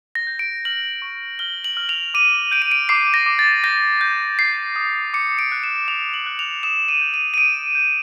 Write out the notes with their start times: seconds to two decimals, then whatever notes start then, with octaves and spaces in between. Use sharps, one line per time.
0.15 A#6
0.27 G6
0.39 D7
0.65 F6 F#7
1.02 C#6
1.39 F6 G7
1.64 F#7
1.77 F6
1.89 F7
2.14 D6 D#7
2.51 G6 D7
2.62 D#7
2.71 D7
2.89 D6 C7
3.14 A#6
3.26 D6
3.39 A6
3.64 G6 A#6
4.01 G6
4.39 G6 C7
4.76 D#6
5.14 D6 C#7
5.39 D7
5.52 F#6
5.63 E7
5.88 D6 F7
6.14 F#7
6.26 F#6
6.39 F7
6.63 D#6 E7
6.88 D#7
7.01 G6
7.14 D#7
7.34 D#7
7.38 D#6 D7
7.75 G6